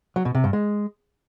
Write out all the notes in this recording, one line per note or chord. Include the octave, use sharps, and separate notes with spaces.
F#3
B2
C3
G2
G#3